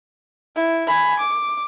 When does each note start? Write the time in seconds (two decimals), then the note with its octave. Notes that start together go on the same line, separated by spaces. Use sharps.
0.56 E4
0.88 G#5 B5
1.20 D6